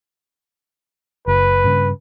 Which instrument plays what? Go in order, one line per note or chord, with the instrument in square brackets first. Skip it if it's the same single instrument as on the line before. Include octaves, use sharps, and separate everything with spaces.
[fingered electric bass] F#1 [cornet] B4
[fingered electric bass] G2 C#3